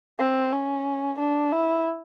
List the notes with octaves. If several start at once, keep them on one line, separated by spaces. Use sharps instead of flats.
C4
C#4
D4
E4